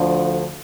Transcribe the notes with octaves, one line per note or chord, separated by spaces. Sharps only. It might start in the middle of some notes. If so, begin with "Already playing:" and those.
Already playing: D2 D3 F3